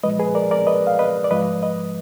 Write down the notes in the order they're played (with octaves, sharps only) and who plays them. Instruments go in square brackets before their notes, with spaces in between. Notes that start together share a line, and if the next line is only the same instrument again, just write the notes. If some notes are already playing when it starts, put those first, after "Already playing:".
[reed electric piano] A#2 F3 G#3 B4 D#5
G#4 B4
A#4 D5
A#4 D5
B4 D#5
F5
B4 D#5
D5
G#2 F3 G#3 B4 D#5
B4 D#5